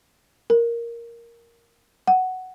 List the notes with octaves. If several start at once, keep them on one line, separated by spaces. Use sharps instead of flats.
A#4
F#5